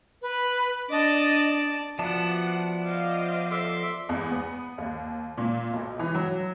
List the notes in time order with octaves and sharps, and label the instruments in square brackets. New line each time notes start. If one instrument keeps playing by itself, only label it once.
[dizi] B4
[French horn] D4 [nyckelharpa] D5 A5 [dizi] D#5
[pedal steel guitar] F3 B3 A5 [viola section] F#4 F#5 [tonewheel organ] D5 E5 D6
[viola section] C5 D#5 F5
[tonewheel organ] A4 D5 [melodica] E5 C6 D6
[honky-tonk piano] E2
B3
D#2
A#2
B1
E3
F#3